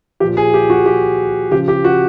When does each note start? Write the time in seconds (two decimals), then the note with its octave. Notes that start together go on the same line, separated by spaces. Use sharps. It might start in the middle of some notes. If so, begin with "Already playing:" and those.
0.20 A#2 F3 G4
0.37 G#4
0.54 G4
0.70 F#4
0.86 G4
1.51 C#3 F3 G4
1.68 G4
1.84 F#4